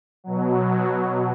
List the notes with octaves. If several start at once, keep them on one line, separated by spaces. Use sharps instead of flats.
B2 F#3